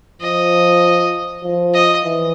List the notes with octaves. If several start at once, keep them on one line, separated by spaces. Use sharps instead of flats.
F3 D#5
F3
D#5
E3